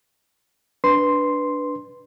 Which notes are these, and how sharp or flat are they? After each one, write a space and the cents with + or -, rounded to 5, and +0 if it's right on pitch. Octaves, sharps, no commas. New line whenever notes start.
D4 +0 B4 +0 C6 +0